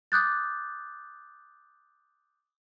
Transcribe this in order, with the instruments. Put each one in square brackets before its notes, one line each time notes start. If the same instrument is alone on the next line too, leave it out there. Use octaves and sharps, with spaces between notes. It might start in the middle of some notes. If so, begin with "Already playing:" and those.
[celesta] D6 D#6 F#6 G6 A6